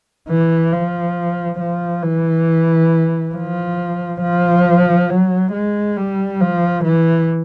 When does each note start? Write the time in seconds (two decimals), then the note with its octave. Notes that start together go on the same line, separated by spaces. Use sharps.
0.29 E3
0.73 F3
1.60 F3
2.03 E3
3.35 F3
4.22 F3
5.10 F#3
5.53 G#3
5.97 G3
6.41 F3
6.85 E3